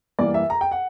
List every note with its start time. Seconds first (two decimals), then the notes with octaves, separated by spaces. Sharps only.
0.19 G2 E3 A#3 D5
0.34 E5
0.50 A#5
0.61 G5
0.71 F#5